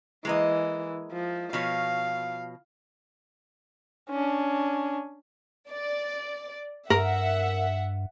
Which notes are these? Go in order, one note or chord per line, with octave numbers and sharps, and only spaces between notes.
E3 G#3 A#3 D#5
F3
B2 F3 C#5 F5
C#4 D4
D5
G2 A#4 E5 F#5